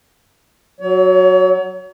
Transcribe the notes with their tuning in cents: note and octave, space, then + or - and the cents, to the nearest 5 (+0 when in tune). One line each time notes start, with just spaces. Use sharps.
F#3 +0 C#5 +35